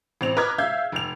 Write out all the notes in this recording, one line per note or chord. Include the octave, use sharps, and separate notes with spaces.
A1 C4 F7
B4 D#5 A#5 D6 F6 G#6
E5 F5 E6 G6 G#6
F1 F7